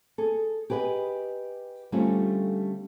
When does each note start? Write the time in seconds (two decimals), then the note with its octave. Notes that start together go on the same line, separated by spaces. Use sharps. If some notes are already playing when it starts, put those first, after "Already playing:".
0.18 G#4 A4
0.70 G4 G#4 B4 D#5 G5
1.92 D3 G3 A3 C4 C#4 F4